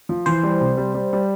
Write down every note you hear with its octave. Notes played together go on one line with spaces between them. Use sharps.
F3
E3 C5
G3
C3
G3
G3
G3